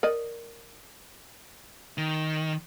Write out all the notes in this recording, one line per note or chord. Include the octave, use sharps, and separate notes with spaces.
A#4 D5 D#5
D#3